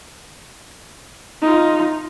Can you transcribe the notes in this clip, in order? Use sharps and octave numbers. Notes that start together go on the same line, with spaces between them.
D#4 F4